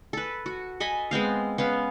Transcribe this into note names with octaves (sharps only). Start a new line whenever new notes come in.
A4 B4
F#4
A4 D#5 G#5 B5
G#3 B3 C4 F5
B3 C#4 F5